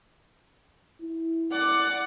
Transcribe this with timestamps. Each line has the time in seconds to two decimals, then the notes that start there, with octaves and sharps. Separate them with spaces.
1.01 E4
1.51 D5 F#5 D6